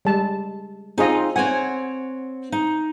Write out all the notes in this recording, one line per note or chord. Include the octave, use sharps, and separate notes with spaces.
G3 G#3 A5
C4 D#4 F4 G#4 D#5
C4 C#5 F#5 G#5
D#4